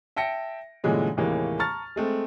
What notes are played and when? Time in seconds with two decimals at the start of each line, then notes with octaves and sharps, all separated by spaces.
0.16 E5 G5 A5 A#6 C#7 D7
0.84 G2 A#2 D3 E3 G#3 C#4
1.17 D#2 A2 C3 E3 G#3 A#3
1.59 A5 A#5 C#6 F6 A6
1.96 G#3 A3 C4